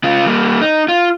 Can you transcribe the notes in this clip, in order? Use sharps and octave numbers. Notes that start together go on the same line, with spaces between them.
C#3 F4
G3 A#3
D#4
F4